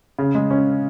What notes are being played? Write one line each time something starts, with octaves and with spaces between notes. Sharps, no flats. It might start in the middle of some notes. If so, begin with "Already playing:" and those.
C#3
G#3
C#4